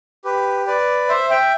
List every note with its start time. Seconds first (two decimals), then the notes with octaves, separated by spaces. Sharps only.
0.25 G4 B4
0.66 B4 D5
1.09 C5 E5
1.30 E5 G5